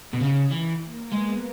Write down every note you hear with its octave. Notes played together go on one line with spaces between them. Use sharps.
B2
C#3 D#4
E3
A#3
G#3 B3